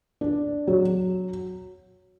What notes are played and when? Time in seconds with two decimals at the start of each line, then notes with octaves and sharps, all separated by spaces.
0.21 D4
0.67 F#3